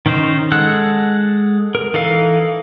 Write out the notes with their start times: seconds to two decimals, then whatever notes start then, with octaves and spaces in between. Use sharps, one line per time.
0.06 D#3 C#4 D#4 C5
0.52 G#3 A4 F#5 E6 F#6
1.75 A#4
1.94 E3 D#4 A4 F5